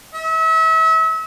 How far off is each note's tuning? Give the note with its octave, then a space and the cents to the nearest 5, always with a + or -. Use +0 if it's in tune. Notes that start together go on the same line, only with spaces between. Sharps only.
E5 -35